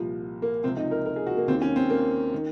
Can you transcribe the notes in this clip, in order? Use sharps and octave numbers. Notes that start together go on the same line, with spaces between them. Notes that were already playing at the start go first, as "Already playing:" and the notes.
Already playing: C2 A#2 F3
A#3
C#2 C3 F3 C4
D#4
A#4
A#4
G#4
F#4
A#3
D#2 D#3 C4
C#4
C4
A#3
D#3